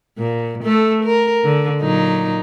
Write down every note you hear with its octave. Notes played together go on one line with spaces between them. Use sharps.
A#2
A3 A4
A#4
D3
A#2 F#3 D#4